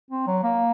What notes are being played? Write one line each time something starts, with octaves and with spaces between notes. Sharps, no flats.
C4
F#3
A#3